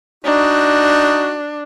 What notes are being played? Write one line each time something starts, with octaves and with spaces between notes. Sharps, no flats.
D4 D#4 F#4